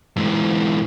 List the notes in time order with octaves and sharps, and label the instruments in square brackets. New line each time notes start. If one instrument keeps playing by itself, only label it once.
[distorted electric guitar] G#2 E3